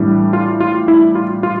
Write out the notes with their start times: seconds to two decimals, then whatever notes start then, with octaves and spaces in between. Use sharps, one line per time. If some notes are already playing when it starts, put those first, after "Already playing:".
Already playing: A2 E3 G3 D4
0.33 F4
0.60 F4
0.88 E4
1.15 F4
1.43 F4